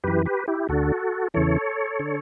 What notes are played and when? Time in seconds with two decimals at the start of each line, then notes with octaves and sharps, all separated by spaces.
0.04 F#2 E3 G4 B4
0.25 G4 B4
0.48 E4 G4
0.69 D2 D3 F#4 A4
1.34 E2 C#3 E3 A4 C#5
2.00 D3